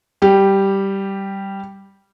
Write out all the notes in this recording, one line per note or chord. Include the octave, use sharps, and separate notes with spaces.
G3 G4